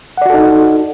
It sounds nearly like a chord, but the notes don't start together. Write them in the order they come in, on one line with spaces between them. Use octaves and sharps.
F#5 D5 F#4 A4 D#4